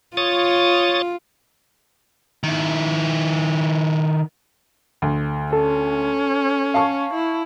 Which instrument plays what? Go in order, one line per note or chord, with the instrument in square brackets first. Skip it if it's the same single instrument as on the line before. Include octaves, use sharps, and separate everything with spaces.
[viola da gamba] F4 [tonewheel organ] C#5 D#6 A6
[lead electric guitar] D#3 E4
[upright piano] D2
[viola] C#4 [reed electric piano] A4
[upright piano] F5 A5 C#6
[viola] E4